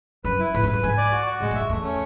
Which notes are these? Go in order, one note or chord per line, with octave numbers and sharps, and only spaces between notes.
F#2 B4
E4
A2 B4
G#2
F#2 B4
G#2 G#5
D5
F#4
F#4
A2 G#3
G#2
E5
F#2
E2 A3
C#4